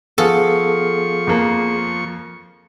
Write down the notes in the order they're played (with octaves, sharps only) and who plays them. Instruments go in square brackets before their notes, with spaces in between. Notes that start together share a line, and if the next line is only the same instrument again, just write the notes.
[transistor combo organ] F3 C#6 [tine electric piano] B3 G#4 F5 [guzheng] A4
[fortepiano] F2 A#3